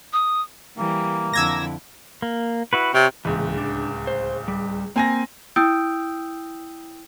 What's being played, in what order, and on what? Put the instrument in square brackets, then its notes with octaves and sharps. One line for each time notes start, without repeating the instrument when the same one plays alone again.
[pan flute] D#6
[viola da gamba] E3 G3 [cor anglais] A#3
[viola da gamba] F2 D3 E4 [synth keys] E6 G#6 A#6
[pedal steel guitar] A#3
E4 F#4 B4
[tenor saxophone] C3 [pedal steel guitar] C#5
[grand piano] D1 C#2 [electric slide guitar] A#2 E3
[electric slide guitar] D4
C5
G3
[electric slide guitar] A#3 [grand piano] C4 G#5 A#6
[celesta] E4 G5 D#6 E6 G6 D7